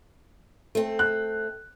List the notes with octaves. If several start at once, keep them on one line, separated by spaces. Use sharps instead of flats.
A3 C4
F#6